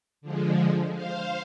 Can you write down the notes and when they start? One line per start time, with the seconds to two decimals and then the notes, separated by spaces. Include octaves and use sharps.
0.21 D3 F3 G#3
0.94 C5 F5